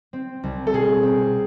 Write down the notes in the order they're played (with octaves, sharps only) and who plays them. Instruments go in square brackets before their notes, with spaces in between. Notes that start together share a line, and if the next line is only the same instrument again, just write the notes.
[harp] C4
C2
[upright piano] A4
[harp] B2 [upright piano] G#4
[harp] C4